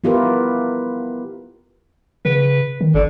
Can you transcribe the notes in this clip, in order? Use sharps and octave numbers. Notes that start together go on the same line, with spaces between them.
B3 E4 F4 G4 A#4 B4
C#3 B4
D#3
G1 D3